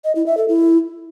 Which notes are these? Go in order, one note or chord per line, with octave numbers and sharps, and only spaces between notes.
D#5
E4
E5
A4
E4